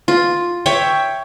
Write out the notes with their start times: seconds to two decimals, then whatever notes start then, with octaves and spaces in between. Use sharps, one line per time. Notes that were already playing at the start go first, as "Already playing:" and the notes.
0.08 F4
0.66 C#5 E5 G5